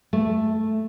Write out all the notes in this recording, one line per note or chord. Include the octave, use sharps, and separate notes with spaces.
A3